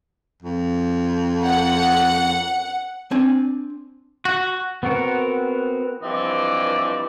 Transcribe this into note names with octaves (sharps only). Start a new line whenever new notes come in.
F2
F#5
C4 D4 G#5
F#4
B3 C4 F#4 A#4 C#6
G2 E3 F3 C4 D5 D#5